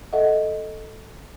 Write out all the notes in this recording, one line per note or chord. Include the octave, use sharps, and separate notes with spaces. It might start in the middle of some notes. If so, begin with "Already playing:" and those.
A4 D#5 E5 F#5